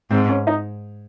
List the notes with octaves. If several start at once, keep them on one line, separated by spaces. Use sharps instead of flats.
G#2 C4
C#4
D#4